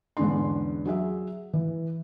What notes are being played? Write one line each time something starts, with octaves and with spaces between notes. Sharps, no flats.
E2 G#2 D3 C#4 D4 C6
F#3 G#4 E5
E3